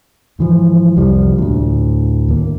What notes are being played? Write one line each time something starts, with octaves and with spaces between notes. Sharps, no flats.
G#2 E3 F3
C2 F2 F3 G3
D2 A2
D#2 A#3